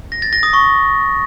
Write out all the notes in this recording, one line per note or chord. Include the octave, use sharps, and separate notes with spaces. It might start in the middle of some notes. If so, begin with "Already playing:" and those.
A#6
A6
A#6
D#6
C#6